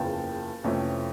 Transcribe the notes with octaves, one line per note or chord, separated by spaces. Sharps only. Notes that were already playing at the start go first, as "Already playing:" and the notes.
Already playing: F#1 E2 C#3 F3 G5 A5
F2 C3 E3 A3 C#4